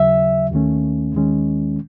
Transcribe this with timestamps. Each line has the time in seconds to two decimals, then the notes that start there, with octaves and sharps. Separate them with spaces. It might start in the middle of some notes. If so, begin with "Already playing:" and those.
Already playing: D#2 C#3 F#3 E5
0.52 D#2 D#3 A3 C#4
1.15 D#2 D#3 G#3 C#4